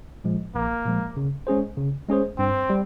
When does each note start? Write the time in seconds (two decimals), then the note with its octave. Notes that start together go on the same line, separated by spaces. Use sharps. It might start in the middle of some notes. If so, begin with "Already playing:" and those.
0.24 A#2 F3 G#3
0.55 A#1 A#3
0.86 A#2 F3 G#3
1.17 C#3
1.47 G#3 C#4 G#4 C5
1.77 C#3
2.08 G#3 C#4 G#4 C5
2.38 G2 C4
2.70 G3